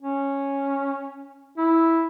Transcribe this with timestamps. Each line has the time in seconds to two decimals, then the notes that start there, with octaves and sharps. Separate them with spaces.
0.03 C#4
1.58 E4